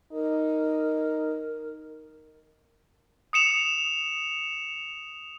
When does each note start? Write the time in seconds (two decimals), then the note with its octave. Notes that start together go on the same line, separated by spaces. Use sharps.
0.12 D#4 A#4
3.33 D#6 C#7 E7 F7